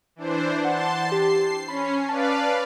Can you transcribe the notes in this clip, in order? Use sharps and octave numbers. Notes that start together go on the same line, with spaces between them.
E3 D4 C5
F#5 A5 C6
G4 C7
C#4 B5
B4 D5 F5 A5